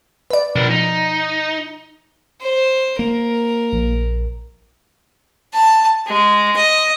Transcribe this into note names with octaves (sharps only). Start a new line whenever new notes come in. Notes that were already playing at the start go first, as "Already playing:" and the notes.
B4 D5
B2 F3 D4 A#4
D#4
C5
A#3 A#4
A#1
A5
G#3
D#5